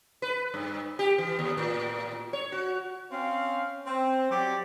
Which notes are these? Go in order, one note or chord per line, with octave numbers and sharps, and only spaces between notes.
B4
G2
G4
E3
D#2
A2
C#5
F#4
C4 C#4 F5
C4
F#3 G4 D5